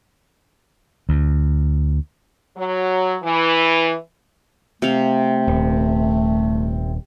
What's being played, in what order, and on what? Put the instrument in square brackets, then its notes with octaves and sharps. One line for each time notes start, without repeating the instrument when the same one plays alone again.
[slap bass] D2
[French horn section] F#3
E3
[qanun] C3 F5 [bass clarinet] A3
[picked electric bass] D#1